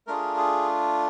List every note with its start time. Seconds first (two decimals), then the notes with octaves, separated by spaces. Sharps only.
0.07 A3 D4 F4 G#4 A#4
0.37 G#4